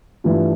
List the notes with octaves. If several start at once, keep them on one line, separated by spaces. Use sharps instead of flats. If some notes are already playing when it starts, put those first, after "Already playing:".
G2 E3 A3 F4